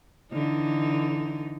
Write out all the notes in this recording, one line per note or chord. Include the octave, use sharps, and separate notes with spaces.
D3 E3 D#4